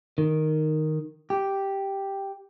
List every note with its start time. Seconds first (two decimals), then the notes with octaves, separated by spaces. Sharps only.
0.18 D#3
1.30 G4